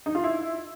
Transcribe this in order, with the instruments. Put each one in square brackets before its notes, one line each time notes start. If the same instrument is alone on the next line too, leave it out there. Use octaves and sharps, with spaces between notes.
[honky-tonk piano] D#4
F4
E4